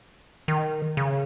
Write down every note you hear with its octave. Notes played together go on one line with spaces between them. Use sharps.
D#3
C#3